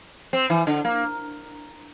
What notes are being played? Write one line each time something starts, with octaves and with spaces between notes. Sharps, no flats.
C4
E3
D3
A#3